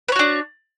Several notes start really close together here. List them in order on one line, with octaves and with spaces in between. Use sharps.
B4 C#5 F#4 D4